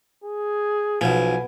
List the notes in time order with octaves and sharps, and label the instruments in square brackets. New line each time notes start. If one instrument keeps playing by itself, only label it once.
[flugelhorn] G#4
[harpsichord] B1 F3 [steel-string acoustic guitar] B2 [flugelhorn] G#5